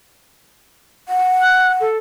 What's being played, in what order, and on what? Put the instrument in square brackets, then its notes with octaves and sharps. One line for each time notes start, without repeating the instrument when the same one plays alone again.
[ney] F#5
[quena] F#6
A4